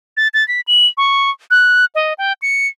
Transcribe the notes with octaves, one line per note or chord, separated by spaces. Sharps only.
A6
A6
B6
F#7
C#6
F#6
D#5
G5
C#7